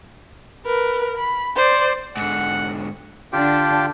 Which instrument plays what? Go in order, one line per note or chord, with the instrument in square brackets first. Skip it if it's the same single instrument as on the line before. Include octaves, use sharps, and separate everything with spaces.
[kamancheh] A#4 B4
B5
C5 D5
[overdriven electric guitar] G#2 D3 [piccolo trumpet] F#5
[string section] D3 D4 [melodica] F4 G4 G5